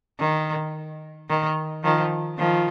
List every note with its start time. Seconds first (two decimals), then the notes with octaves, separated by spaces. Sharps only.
0.20 D#3
1.29 D#3
1.84 D#3 F3
2.38 D#3 F3